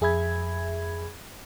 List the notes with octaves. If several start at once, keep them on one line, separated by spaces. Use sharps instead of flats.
F2 G#4 E5 B5 G#6